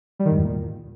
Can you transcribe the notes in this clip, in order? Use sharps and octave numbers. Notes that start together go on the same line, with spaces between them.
G3
D#3
G#2
E2
A#2